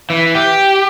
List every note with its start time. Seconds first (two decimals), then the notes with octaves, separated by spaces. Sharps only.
0.10 E3
0.35 G4